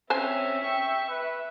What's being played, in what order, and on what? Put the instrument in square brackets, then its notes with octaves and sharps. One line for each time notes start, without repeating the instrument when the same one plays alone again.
[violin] C4 C#4 [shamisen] C5 G#5 [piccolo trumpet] E5
[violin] G5 C#6
[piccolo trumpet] B4 [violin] E5